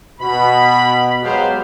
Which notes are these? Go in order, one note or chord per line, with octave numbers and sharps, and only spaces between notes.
B2 B5
F#3 G#3 B3 G4 C5 F5